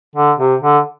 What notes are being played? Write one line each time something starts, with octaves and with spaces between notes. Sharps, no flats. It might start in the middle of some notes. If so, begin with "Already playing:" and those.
D3
C3
D3